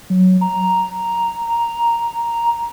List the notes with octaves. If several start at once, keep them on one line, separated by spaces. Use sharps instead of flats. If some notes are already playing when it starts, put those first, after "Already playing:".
F#3
A#5